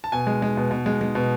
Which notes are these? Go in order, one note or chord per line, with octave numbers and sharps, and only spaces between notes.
A5
B2 G#5
G#3
G#3
B2
B2
G#3
G#3
B2